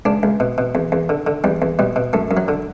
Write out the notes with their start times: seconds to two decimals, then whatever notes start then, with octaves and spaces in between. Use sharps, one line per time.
0.05 C#2 D4
0.23 C#2
0.40 B2
0.58 B2
0.75 E2
0.92 E2
1.09 D3
1.27 D3
1.44 E2 G3
1.62 E2
1.79 B2 G3
1.96 B2
2.13 F#2 A3
2.31 F#2
2.37 F#3
2.48 D3